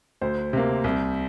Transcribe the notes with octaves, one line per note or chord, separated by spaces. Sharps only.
D2 C5
C3 A#3
C2